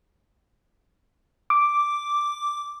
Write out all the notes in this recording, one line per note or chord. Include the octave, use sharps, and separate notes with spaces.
D6